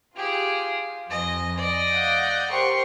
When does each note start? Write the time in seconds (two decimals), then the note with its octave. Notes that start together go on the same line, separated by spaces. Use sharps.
0.16 F4 G4 G#4
1.10 F2 D#5 G#5
1.58 D5 D#5
1.93 F5 F#5 G6
2.51 G4 A#4 C5 C6 C#6